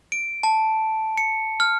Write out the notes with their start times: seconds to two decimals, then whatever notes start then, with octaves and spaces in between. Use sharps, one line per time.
0.12 D7
0.43 A5
1.17 C#7
1.60 F6